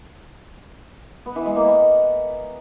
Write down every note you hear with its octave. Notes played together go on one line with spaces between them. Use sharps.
B3
E3
G#3
A#3
B3